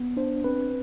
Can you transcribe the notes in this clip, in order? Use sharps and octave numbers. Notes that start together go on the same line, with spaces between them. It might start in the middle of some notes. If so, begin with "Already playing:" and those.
Already playing: B3
D4 C5
C4 B4